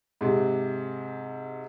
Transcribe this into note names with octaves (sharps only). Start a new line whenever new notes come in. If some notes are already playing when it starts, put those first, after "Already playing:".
G#2 C3